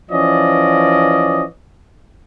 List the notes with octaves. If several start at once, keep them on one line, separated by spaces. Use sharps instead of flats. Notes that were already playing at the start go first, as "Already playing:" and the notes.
E3 F3 C#4 D5 D#5